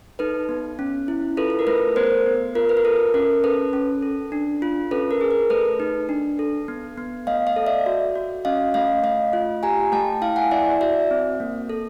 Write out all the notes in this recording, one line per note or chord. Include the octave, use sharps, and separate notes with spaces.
D#4 A4 B4
B3
C#4
E4
F4 A4 B4
A4
A#4
A3 A4 B4
B3 A#4 C5
B3
F4 A#4
B4
A#4
A4
C#4 A#4
C#4 A4 B4
C#4
A4
D4
F4
C#4 A4 B4
A#4
G#4
A#4
A3 A4 B4
D#4
D4
A4
B3
B3
A3 D#5 F5
D#5 F5
A4
D5 E5
F#4
F#4
C#4 D#5 F5
A3 D#5 F5
A3 D#5 F5
F4
G4 G#5 A#5
A3 G5 A5
E4 F5 G5
F#5 G#5
E4 D5 E5
F#4 D5 E5
C4
A#3
A4